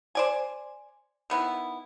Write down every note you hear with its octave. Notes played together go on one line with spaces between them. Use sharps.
C5 D5 G#5
D#3 B3 E4